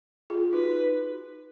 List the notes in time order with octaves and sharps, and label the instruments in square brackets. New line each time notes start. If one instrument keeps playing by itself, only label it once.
[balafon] F4 G#4
[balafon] D#4 F#4 [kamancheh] B4